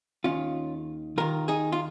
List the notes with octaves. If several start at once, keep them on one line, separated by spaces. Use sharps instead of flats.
D#2 D#3 C#4 F4
D#2 D#3 F4 A#4
D#4 G#4
F4